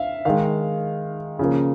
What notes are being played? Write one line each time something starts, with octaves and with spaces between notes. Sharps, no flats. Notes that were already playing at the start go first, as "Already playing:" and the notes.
Already playing: E5 F5
D#3 G#3 F5
C#3 F3 A#3